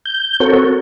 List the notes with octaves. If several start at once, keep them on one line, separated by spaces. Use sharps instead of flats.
G6
C4 F#4 A4 A#4 C#5